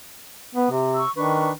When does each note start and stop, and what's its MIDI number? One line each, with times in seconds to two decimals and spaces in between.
0.55 0.69 59
0.71 1.02 48
0.95 1.10 85
0.95 1.10 88
1.16 1.50 51
1.16 1.51 62
1.16 1.51 71
1.16 1.51 85